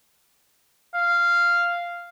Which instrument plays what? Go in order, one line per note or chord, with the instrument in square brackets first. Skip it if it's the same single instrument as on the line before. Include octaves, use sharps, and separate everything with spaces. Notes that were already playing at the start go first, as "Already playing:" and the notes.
[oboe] F5